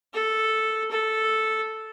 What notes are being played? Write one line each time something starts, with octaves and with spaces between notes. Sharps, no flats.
A4
A4